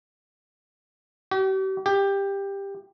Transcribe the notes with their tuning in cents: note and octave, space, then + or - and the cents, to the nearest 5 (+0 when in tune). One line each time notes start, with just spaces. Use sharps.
G4 -40
G4 +15